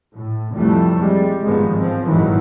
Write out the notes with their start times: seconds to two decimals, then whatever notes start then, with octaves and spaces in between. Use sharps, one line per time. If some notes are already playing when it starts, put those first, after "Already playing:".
0.14 A2
0.52 F1 F2 C3 E3 G3 A3
0.99 G3 G#3
1.44 G1 G#2 D#3 F3 G#3 B3
1.76 F3 C4
2.08 G#1 G2 A#2 D#3 E3 F#3